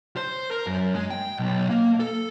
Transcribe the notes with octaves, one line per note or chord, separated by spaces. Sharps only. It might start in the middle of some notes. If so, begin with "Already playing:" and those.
C5
A#4
F#2
G#3
G5
B1
A#3
A4